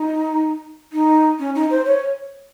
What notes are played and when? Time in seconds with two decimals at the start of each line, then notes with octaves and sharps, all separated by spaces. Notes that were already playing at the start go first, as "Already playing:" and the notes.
Already playing: D#4
0.93 D#4
1.39 C#4
1.55 D#4
1.71 C5
1.86 C#5